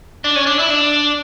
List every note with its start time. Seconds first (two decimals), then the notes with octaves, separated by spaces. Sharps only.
0.24 D4
0.36 C#4
0.46 D4
0.59 E4
0.70 D4